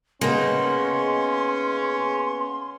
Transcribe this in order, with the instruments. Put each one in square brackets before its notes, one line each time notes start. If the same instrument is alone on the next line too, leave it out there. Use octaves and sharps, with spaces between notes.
[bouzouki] C#3 D#4 [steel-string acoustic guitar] A#3 B3 [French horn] C#4 [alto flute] C6